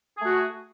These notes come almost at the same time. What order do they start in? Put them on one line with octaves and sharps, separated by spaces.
G#4 A3 F#4